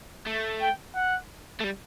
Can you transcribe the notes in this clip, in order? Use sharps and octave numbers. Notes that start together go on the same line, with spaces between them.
A3
G5
F#5
A3
G3